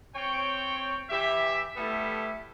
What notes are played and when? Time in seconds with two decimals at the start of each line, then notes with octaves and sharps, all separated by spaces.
0.14 C4 C#5 G5
1.10 E3 G4 E5
1.77 G3 A3 B3 E4 A4